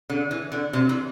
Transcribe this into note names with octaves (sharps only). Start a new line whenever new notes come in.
D3
E3
D3
C3
E3